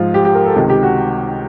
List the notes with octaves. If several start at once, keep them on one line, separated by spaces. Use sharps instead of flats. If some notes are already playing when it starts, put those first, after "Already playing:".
Already playing: G#2 F3 F4
G4
G4
A#4
A4
C#2 C3 D#3
G4
F#4